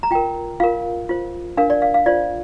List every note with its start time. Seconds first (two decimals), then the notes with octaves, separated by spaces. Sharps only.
0.03 A#5
0.11 F4 A#4 G5
0.60 F4 A#4 F5
1.09 F4 C5
1.57 D4 A#4 F5
1.70 D5
1.82 F5
1.94 F5
2.06 F4 C5 D5